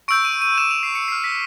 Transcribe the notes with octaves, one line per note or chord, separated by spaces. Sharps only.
C#6 E6 G6 D7
D#7
D#7
D6 G6 E7
F7
C7
C#7
C#6 F6 C7
B6